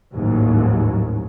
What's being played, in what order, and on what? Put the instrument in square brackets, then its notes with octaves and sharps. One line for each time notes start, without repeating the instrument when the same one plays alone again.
[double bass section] A1 D#2 G#2 F#3